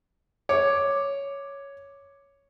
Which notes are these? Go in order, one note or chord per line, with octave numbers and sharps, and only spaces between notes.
C#5 D6